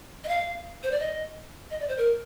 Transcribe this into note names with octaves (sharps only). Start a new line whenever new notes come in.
D#5
F5
C5
D5
D#5
D#5
D5
C5
A#4